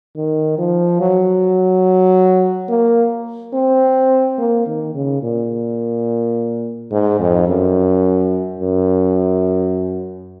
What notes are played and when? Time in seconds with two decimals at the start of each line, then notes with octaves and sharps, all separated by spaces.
0.16 D#3
0.58 F3
1.01 F#3
2.69 A#3
3.54 C4
4.39 A#3
4.67 D#3
4.94 C#3
5.23 A#2
6.91 G#2
7.20 F2
7.48 F#2
8.60 F#2